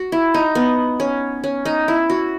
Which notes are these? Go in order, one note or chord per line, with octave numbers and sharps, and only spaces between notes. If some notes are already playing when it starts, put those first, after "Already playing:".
Already playing: F#4
E4
D#4
B3
C#4
C#4
D#4
E4
F#4